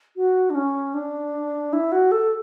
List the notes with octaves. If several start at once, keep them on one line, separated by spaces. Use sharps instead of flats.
F#4
D4
C#4
D4
E4
F#4
A4